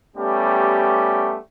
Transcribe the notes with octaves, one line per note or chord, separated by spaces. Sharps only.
G3 A3 B3 C#4 G4